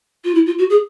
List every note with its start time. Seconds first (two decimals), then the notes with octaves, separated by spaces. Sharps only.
0.25 F4
0.35 E4
0.46 F4
0.59 F#4
0.70 G#4